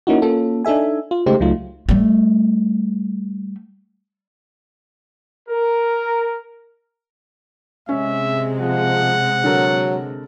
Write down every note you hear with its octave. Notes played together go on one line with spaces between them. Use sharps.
A#3 C#4 D#4 E4 F#4
A#3 C#4 F4 A4
D4 D#4 A4 E5 G#5
F4
C#3 G#3 A3 D#4 G4 C5
C#2 F#3 A3 D#4 F4
G3 A3
A#4
C3 G#3 C#4 E5
F3 F#5
D3 F#3 A4 A#4